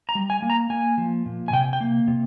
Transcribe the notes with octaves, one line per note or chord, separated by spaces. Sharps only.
A#5
G3
G#5
A#3
A#5
A#3 G#5
F3
A#2
G#5
C3 G5
G5
A#3
C3